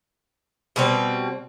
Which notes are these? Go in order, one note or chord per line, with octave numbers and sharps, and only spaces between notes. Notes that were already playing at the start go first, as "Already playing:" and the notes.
B2 G3 C4